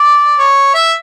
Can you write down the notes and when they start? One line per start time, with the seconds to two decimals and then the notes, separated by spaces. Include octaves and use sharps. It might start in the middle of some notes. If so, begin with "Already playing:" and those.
Already playing: D5
0.39 C#5
0.74 E5